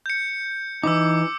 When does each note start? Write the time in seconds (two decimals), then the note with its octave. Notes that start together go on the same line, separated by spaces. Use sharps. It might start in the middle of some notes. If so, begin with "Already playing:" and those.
0.06 G6 C#7
0.83 E3 D#4 D6 E6